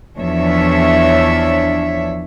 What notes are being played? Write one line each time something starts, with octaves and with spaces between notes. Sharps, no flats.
E2 F3 D4 C#5 E5